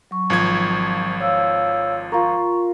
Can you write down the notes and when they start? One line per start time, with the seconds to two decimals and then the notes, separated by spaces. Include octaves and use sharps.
0.11 F#3 C#6
0.30 G#1 F3 G#6
1.20 C#5 F5 E6
2.12 F4 A#4 C#6